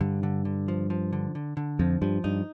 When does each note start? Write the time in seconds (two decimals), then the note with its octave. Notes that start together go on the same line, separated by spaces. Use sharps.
0.01 G2 D3
0.23 D3
0.45 D3
0.68 F3
0.90 F3
1.13 D3
1.35 D3
1.57 D3
1.79 F2 F3
2.02 G2 F3
2.24 G2 D#4